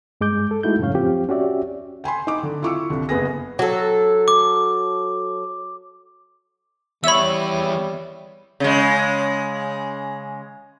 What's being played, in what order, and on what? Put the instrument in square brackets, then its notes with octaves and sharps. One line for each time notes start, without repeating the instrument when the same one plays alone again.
[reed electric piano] G2 G#3 D6 G6
A4
G#3 A3 D#4 E4 F#4 G6
F#2 A2 C#3 C#4 C#5 F5
F3 C4 F4 G4
C#4 F#4 G4 D5 E5
[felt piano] G5 G#5 B5 C6
D#4 D6
D3
E4 F4 C#6 D6 E6 C#7
C2 D3
F#1 B3 G#4 A#6
[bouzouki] F#3 A4
[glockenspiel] D6
[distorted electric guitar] E3 B3 [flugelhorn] G3 [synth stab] C#5 E5 [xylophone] B5 E6
[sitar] C#3 G#3